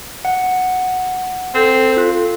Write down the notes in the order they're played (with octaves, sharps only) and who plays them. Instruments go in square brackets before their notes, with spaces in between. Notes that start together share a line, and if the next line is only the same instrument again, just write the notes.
[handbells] F#5
[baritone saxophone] C4 [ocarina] A4 [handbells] G6
[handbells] F4 F#6